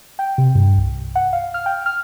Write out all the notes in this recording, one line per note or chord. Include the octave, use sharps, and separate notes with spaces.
G5
C3
G2
C2
F#5
F5
F6
G5
F6